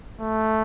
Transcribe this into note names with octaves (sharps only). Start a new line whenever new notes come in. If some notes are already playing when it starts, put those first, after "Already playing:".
A3